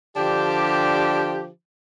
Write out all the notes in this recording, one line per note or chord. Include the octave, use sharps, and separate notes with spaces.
D3 F3 D4 G4